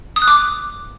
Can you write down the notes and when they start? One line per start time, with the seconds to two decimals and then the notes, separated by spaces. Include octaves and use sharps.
0.16 D#6
0.22 F#6
0.28 D6